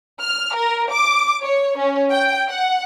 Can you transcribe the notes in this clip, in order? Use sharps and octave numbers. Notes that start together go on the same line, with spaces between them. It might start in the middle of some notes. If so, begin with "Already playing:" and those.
F6
A#4
D6
C#5
C#4
G5
F#5